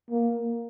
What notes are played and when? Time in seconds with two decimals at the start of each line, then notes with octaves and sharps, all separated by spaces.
0.11 A#3